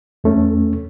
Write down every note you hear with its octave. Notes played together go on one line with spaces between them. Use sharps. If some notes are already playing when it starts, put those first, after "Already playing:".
E2 A3 C#4